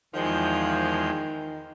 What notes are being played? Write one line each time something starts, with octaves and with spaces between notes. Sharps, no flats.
E2 D#3 F3 G#3 G6